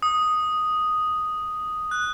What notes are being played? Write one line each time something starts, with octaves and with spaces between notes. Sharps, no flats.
D#6
F#6